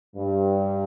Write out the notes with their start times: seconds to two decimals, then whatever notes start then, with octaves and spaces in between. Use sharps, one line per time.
0.16 G2